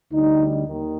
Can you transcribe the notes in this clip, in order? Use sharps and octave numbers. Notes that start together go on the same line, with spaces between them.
D2 D3 G3 D#4
D#2 D#3